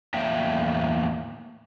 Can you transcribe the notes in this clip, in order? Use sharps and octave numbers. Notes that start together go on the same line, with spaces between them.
E2 A2 A#3 E5 G5